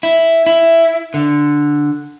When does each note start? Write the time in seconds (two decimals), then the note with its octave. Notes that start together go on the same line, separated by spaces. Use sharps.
0.03 E4
0.47 E4
1.14 D3